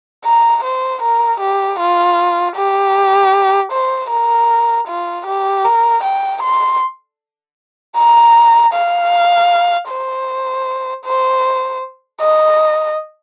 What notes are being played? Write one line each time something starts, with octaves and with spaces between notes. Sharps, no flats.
A#5
C5
A#4
G4
F4
G4
C5
A#4
F4
G4
A#4
G5
C6
A#5
F5
C5
C5
D#5